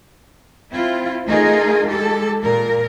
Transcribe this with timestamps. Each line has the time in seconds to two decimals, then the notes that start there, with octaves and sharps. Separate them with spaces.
0.71 C4 E4 F4
1.27 A3 D#4 F4 G#4 A#4
1.87 G#3 G4 A4
2.42 A#2 A#4